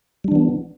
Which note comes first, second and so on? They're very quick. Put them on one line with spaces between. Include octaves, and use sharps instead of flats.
G3 D4 E3 B3